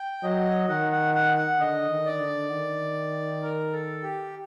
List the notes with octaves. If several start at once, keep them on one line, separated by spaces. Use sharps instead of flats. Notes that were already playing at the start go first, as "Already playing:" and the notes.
Already playing: G5
F#3 D#5
D#3 F#5
F#5
F#5
F#5
D3 D#5
D#3
D5
D3
D#3
A#4
A4
G4